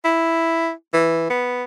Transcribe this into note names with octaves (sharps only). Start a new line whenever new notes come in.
E4
E3
B3